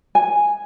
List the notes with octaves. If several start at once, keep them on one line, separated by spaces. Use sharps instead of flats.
G#5